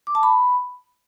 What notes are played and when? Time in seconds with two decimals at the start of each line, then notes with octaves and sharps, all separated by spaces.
0.07 D6
0.15 A5
0.23 B5